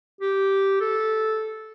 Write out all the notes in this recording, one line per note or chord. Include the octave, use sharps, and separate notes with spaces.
G4
A4